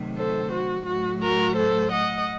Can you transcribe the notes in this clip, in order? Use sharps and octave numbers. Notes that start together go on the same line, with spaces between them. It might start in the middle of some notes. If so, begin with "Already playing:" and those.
Already playing: C3 D#3 F#3 A3
A4 C5
F#4
A2 F#3 A3 F#4
F#4 A#4
A4 C5
D#5 F#5